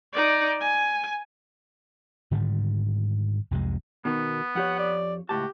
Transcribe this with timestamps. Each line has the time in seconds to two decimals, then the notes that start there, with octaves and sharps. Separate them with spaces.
0.13 D#4 D5
0.60 G#5
2.31 G#2 D3 D#3 G3
3.51 C2 F2 C3 G#3
4.05 B2 D#3 B3
4.55 F2 G4 C#5 F#5
4.78 D5
5.29 C#2 A2 F#4 G4 A5